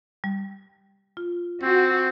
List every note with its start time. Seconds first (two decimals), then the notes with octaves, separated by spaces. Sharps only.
0.24 G3
1.17 F4
1.62 C4 F#4